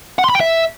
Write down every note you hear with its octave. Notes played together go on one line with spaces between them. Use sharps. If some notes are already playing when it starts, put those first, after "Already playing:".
F#5
C6
B5
G5
E5